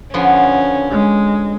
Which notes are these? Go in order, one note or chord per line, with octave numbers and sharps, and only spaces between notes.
D3 F3 B3 C#4
G#3